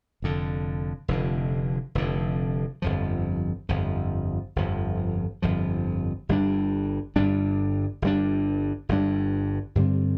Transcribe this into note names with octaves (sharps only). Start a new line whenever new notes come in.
F1 F2 D3
F1 F2 D3
F1 F2 D3
G1 F2 F3
G1 F2 F3
G1 F2 F3
G1 F2 F3
G1 G2 G3 D4
G1 G2 G3 D4
G1 G2 G3 D4
G1 G2 G3 D4
G2 D3 G3 C4